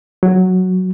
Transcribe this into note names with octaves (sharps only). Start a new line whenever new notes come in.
F#3